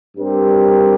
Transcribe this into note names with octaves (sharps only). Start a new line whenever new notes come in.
G2 G3 C4 G4 A#4